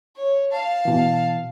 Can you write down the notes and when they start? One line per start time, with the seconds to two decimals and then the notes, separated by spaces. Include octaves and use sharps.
0.16 C#5
0.51 F5 A5
0.85 B2 E3